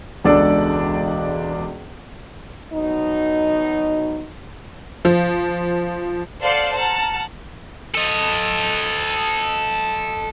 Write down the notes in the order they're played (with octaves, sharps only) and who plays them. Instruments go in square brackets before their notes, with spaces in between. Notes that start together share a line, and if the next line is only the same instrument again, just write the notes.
[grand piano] E1 C#2 D4 A4 D5
[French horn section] B2 F#3 D#4
[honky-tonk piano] F3
[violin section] A4 C5 D5 F5 F#5 A5
F#5 A5 A#5 F6
[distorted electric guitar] A4 D#5